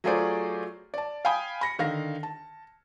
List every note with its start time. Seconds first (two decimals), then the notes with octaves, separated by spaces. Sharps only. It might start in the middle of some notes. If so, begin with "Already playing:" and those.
0.04 F#3 A3 F4 G#4 C5 D5
0.94 D5 A5
1.25 F5 G5 G#5 B5 D#6
1.61 B5 A#6 C#7
1.79 D3 D#3 F5 A#6
2.23 A5